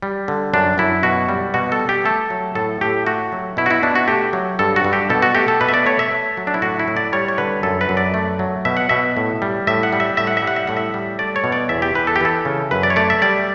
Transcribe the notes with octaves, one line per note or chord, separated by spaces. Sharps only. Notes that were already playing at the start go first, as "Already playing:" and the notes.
G3
D3
F#2 D4
F#2 E4
B2 F#4
G3
B2 F#4
A4
G3
G4
A3 A4
F#3
A2 A4
A2 G4
A3 F#4
F#3
B2 E4
F#4
E4
B2 D4
F#4
A3 G4
F#3
G2 A4
F#4
G2
G4
B2 A4
F#4
A3 G4
A4
B2 B4
E5
D5
A3 C#5
E5
A3
F#3
D4
E4
A2 F#4
E4
A2
D5
G3 C#5
C#5
D3 B4
F#2 A4
B4
F#2
D5
A3
F#3
B2 E5
F#5
B2 E5
A2
G3
A2 E5
F#5
G3
E5
A2 E5
F#5
E5
G3
F#5
E5
A2 F#5
E5
G3
A3 D5
C#5
B2
D5
E2 E5
G4
E2 B4
A4
G4
E3 A4
C#3
F#2 B4
D5
C#5
A3 D5
E5
G3 D5